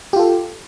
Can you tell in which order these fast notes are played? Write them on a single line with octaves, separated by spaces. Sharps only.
G4 F4 A4